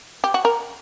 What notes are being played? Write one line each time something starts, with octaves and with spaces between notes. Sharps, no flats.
G4
F#4
A#4